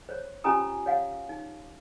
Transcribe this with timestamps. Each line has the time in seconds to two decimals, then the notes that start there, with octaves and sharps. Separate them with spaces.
0.09 C5 C#5
0.44 C#4 F4 G4 G#5 A#5 D#6
0.86 C#5 F5 F#5
1.29 D#4